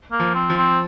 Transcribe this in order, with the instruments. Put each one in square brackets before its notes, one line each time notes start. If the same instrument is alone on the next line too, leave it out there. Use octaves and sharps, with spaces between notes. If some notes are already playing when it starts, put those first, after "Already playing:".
[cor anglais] A#3
[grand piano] F3
[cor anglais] C4
[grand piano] F3
[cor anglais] C4